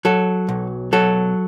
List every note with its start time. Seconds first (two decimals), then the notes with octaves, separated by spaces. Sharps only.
0.05 F#3 A4
0.49 B1
0.93 F#3 A4